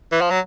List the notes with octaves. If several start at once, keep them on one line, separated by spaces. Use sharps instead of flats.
E3
F3
F#3